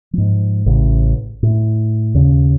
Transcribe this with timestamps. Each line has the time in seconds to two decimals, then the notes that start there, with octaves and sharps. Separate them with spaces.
0.13 G#2 F3
0.66 A1 C#3
1.43 A2
2.14 D#2 C#3 C#4